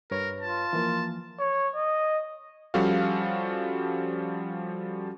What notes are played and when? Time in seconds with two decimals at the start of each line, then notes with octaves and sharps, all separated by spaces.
0.11 G2 A#4 B4 C#5
0.40 F4 A5
0.73 E3 F3 A#3
1.39 C#5
1.75 D#5
2.74 F3 G3 C#4 F#4 A4 F5